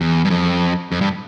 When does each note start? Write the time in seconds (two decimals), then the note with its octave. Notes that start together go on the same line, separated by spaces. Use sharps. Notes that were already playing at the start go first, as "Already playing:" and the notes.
0.01 E2
0.25 G2
0.30 F2
0.92 F2
1.01 G2